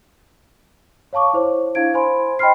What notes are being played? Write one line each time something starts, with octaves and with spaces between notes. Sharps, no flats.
C#5 F5 A5 C#6 D6
E4 C5 C#5
D4 E4 F5 G#6 D7
C5 G#5 B5 C6
D#5 G5 B5 C6 F6 C7